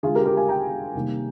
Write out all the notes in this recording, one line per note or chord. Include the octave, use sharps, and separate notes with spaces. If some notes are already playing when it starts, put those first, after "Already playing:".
D3 G#3 F4 G#4
G4 A#4
G4 A#4
F5 G#5
G5 A#5
C3 D#3 G3 A#3